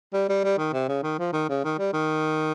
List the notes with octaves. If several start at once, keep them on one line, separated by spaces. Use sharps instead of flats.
G3
G3
G3
D#3
C3
C#3
D#3
F3
D#3
C#3
D#3
G3
D#3